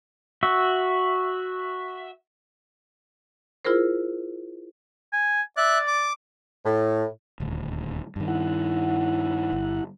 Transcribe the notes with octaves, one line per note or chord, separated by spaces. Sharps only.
F#4 E5
E4 F4 G#4 A#4 C5
G#5
D5 E5 F#6
D6
A2
D#1 D2
G2 D#3
E4 F#5
G1